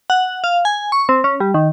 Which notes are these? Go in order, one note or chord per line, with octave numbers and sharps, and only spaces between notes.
F#5
F5
G#5
C#6
C4
C#4
G3
D#3